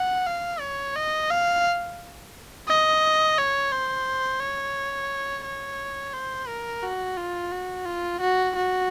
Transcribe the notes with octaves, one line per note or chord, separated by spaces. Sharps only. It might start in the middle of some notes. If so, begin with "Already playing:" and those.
Already playing: F#5
F5
C#5
D#5
F5
D#5
C#5
C5
C#5
C#5
C5
A#4
F#4
F4
F#4
F4
F#4
F#4